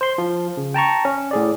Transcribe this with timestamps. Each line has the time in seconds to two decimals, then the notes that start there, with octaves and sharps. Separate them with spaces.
0.01 C5 C6
0.18 F3
0.57 C#3
0.74 G5 A5 A#5 C#6
1.05 C#4
1.31 A2 G#4 D5